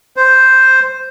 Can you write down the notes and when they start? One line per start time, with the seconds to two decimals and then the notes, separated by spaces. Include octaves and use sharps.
0.16 C5